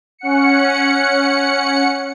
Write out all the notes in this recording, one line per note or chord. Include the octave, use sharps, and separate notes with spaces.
C#4 F#5 C#7